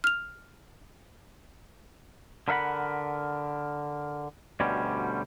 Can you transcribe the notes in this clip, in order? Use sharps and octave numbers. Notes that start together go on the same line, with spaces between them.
F6 F7
D3 A#4 E5 F#5 B5
D2 B2 D3 G3 C#4